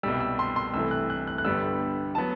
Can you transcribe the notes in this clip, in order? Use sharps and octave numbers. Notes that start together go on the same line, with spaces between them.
C2 B2 G3 E6
E6
C6
C6
C2 C3 E3 A3 E6
F#6
F#6
F#6
F#6
G1 G2 D3 G3 B3 E6
F#3 B3 A5